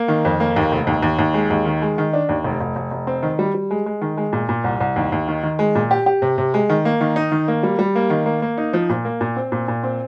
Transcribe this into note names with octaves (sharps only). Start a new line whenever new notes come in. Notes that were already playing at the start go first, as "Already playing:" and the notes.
Already playing: A#3
D#3
F2
A#3
D#2
F1
D#2
D#2
D#2
G#3
D#2
D#3
G#3
D#3
D4
D#2
F1
F1
F1
F1
C4
D#3
G3
G3
G#3
G#3
D#3
G#3
A#2
A#2
C2
C2
D#2
D#2
D#3
D#3
G#3
A#2
G4
G4
C3
C3
G#3
D#3
A#3
D#3
D#4
D#3
A#3
G3
G3
A#3
D#3
A#3
A#3
D#4
F3
A#2
A#3
A#2
C4
A#2
A#2
C4